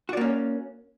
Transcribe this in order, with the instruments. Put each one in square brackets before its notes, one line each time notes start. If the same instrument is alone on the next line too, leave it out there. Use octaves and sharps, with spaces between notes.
[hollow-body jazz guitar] F#4
D5
A#3
C#4